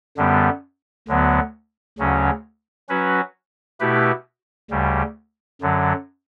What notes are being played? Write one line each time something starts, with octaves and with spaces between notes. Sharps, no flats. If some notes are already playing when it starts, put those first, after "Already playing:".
F#2 D3 G3 B3
D2 D3 F#3 B3
D2 C#3 F#3 C#4
F#3 C#4 F#4 B4
B2 A3 E4 G4 B4
D2 C#3 G3
F#2 D3 F#3